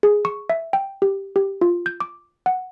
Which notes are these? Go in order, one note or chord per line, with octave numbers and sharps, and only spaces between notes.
G#4
C#6
E5
G5
G4
G4
F4
G6
D6
F#5